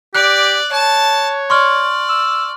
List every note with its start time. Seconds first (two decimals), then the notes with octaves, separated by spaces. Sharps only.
0.15 G4 D5 F#6
0.72 C#5 A5
1.50 D5 C6 C#6 F6
2.09 E6